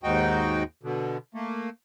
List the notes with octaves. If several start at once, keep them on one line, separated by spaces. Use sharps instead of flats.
D#2 G#2 D#4 F#4 G5
B2 D3
A3 A#3